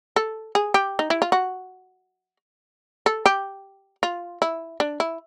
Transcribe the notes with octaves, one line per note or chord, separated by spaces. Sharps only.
A4
G#4
G4
D#4
E4
F4
F#4
A4
G4
F4
E4
D4
E4